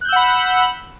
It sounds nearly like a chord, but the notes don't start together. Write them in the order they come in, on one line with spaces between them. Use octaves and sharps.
F#6 G6 E6 F#5 B5